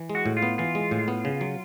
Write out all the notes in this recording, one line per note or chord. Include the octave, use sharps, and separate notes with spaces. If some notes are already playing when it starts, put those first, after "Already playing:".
Already playing: E3
G#3
F#4
A2
F4
B3
E3 F4
G#3
A2
B3
C#3
F#3